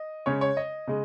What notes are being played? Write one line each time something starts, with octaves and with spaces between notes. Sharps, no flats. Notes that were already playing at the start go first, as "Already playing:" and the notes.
Already playing: D#5
C#3 G#3 C#4 C#5
C#5
D#5
C#3 G#3